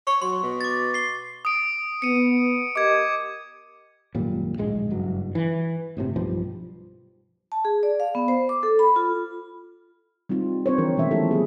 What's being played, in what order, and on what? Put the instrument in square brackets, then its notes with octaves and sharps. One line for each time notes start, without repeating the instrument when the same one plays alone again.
[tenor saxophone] C#5 [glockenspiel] C#6
[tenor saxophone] F#3 [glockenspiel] C6
[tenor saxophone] B2
[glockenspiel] D6 A6
C7 G7
[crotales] D#6 D7
[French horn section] B3 [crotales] C#7 D#7
[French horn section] G4 A#4 D#5 [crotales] D6 G#6
[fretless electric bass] G#1 F#2 A#2 G3
D1 A#1 G#2 G#3
F#1 G2 F#3
E3
G1 A2 C3
B1 G2 F3 G3
[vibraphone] A5
G#4
D5
F5
B3
C5
D6
A4
B5
F4
[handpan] G3 C4 D#4 F4
C4 C5 C#5
D3 E3 F3 D4 A#4
B2 D#3 G#3 A3 C#4 E5
F3 B3 C#4 E4 G4 A4
G3 A3 B3 G#4